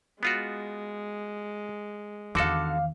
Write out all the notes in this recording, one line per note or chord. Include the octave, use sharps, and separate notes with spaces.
G#3 B3 F4 F#4
E2 D3 D#3 F#4 A4 F5 D6